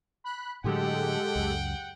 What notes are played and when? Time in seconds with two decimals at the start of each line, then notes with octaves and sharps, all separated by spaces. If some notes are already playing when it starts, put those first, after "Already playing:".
0.24 B5 F#6
0.64 A2 D3 F#3 G#3 G4 A4 F#5 G5
1.36 C#2 F#2